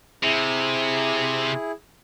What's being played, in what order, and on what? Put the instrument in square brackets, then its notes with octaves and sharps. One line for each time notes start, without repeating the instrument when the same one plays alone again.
[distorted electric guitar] C3 [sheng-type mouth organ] E4 G#4